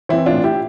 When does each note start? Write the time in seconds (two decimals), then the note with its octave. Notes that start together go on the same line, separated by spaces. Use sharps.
0.09 E3 C4 E4
0.26 D4 F4
0.32 A2
0.44 E4 G4